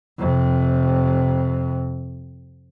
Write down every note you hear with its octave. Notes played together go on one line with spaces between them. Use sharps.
F2 C3